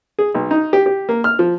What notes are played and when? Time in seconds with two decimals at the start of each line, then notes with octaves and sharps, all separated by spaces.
0.19 G#4
0.34 B1
0.51 D#4
0.73 G4
0.86 G4
1.09 A#3
1.24 F6
1.39 F3